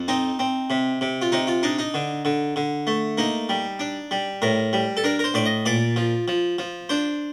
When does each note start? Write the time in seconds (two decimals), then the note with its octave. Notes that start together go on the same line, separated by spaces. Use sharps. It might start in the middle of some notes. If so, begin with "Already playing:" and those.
Already playing: F2
0.08 C4 D#4
0.39 C4
0.70 C3
1.01 C3
1.22 F4
1.32 C3 D#4
1.47 F4
1.63 D4 D#4
1.79 D#4
1.94 D3
2.25 D3
2.56 D3
2.87 A3
3.18 A#3 D#4
3.49 G3
3.79 D4
4.11 G3
4.42 A2 A#4
4.73 G3
4.97 A4
5.04 D4 A#4
5.19 A#4
5.24 C5
5.34 A2 D5
5.46 D#5
5.66 A#2 D5
5.96 F3
6.28 F3
6.59 F3
6.89 D4 C5